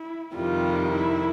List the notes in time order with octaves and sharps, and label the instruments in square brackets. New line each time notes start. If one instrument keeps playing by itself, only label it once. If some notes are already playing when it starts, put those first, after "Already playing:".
Already playing: [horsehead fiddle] E4
[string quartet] F2 C3 D#3 G3 [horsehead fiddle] F4
[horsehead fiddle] E4